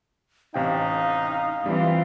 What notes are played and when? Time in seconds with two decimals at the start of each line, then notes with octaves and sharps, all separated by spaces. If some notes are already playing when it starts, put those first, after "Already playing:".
0.54 A1 C3 D#4 F5 G5
1.66 E3 G3 C4 F4